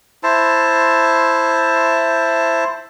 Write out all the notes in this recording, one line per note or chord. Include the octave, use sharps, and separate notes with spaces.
E4 C5 A5